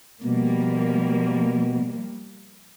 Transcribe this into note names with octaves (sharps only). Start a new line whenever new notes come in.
B2 F3 G3 A#3